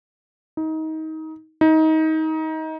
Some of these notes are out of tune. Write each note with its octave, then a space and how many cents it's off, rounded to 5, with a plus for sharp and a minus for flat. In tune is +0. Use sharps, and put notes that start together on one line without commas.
D#4 +25
D#4 +25